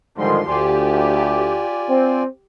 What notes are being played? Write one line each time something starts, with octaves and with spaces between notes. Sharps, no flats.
G#2 D3 D#3 F3 G3 C6
D2 F4 G4 D5 G#5
C4